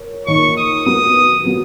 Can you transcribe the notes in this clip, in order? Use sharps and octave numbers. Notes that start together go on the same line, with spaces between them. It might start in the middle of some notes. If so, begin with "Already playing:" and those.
Already playing: A#4 C#5
D#3 A#3 D#4 A#4 C#5 C#6
D#6
F#3 B3 F#4 D#6
F#3 B3 F#4